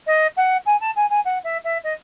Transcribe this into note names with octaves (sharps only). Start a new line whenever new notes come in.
D#5
F#5
G#5
A5
G#5
G#5
F#5
E5
E5
D#5